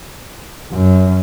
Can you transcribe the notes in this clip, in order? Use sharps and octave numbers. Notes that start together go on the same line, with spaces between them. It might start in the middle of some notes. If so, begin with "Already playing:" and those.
F#2